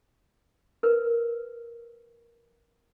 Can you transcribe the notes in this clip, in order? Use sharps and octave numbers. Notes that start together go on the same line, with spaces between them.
A#4 B4